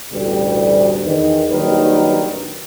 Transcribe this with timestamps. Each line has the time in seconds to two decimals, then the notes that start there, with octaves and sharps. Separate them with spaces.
0.12 A1 D2 B2 G3
1.04 E2 D#3
1.49 A#1 D#2 D#3 F#3 G3 B4